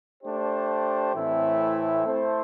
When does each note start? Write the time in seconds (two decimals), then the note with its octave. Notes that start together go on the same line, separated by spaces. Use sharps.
0.21 A3 D4 G4 C5
1.13 A2 E3 A3 C4 E4
2.04 A3 E4 A4 C5